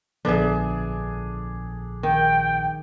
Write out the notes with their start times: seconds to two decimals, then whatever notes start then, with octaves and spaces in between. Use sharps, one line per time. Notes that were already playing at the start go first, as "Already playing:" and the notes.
0.25 A#1 A#2 D3 F3 B3 D4 G#4 E5
2.03 D#3 G5